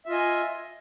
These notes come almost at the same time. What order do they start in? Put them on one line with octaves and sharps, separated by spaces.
E5 F4 D#5 G#5